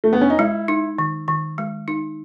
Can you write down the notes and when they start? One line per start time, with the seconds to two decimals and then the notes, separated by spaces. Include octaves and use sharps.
0.04 A3
0.13 B3
0.21 C#4
0.30 D#4
0.39 G#3 E4
0.68 D#4
0.98 D#3
1.28 D#3
1.58 G#3
1.88 D#4